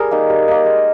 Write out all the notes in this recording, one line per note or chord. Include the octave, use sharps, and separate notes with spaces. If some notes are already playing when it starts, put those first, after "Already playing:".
Already playing: G3 G#4 A#4
A#3 D#4
G3
A#3 D#4
G#3